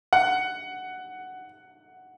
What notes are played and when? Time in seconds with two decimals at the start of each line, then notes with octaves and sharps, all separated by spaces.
0.13 F#5